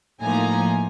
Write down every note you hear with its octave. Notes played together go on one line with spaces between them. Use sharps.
A2 F3 A#3 D#4 G#5 A#5